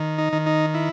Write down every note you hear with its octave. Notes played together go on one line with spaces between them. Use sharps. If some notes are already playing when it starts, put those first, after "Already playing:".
Already playing: D#3
D#4
D#3
D#4
E4